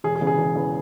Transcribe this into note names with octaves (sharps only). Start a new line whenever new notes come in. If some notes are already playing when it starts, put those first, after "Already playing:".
E1 G#4
G#4
E2 C#3 E3
G#4
E1
E2 C#3 E3